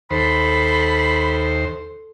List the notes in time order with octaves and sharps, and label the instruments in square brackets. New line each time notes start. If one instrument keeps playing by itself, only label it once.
[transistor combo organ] D#2 C5 [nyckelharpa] A4 C6 [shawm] B5